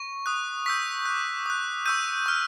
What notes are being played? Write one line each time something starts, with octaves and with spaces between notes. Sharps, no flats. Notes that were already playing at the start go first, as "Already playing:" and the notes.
Already playing: C#6
D#6 F#6
C#6 E6 G6 B6
D6 F#6
D#6 F#6
C#6 E6 G6 D#7
C#6 F6